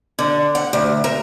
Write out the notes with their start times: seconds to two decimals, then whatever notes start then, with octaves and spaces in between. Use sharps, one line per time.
0.19 D3
0.55 F#5
0.73 D2
1.04 A#4